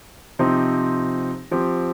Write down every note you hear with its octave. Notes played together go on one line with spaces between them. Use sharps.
C3 F3 C4 D#4 G4
F3 C4 G4